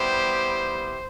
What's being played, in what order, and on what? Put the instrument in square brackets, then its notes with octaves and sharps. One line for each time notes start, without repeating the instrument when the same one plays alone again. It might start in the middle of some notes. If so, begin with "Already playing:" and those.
Already playing: [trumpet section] G3 B3 E4 G4 C5